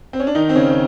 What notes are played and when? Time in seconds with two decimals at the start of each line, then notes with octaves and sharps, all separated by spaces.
0.13 C4
0.20 C#4
0.27 D4
0.35 D#3 D#4
0.49 C4
0.55 C#3 C#4
0.70 C#4